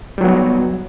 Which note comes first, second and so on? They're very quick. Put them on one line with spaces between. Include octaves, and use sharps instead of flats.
G3 F#3 B3